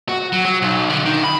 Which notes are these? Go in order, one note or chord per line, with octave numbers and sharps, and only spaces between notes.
F#4
F#3
F#3
B1
D3
D#3
B5